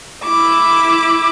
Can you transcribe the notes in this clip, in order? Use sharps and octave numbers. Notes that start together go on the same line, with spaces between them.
E4 D6